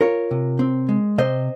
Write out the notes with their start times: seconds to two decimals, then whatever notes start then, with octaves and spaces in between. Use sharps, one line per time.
0.01 F4 A#4 C#5
0.31 C3
0.59 C4
0.89 G#3
1.18 C3 C5 D#5